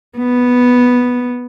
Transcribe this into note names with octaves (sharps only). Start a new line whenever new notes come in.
B3